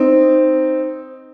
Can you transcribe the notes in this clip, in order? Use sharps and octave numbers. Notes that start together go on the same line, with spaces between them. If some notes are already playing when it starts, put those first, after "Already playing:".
Already playing: C4 D#4